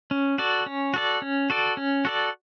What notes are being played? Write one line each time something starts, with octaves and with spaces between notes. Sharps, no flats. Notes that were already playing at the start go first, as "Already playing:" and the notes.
C#4
F#4 A4 D5
C#4
F#4 A4 D5
C#4
F#4 A4 D5
C#4
F#4 A4 D5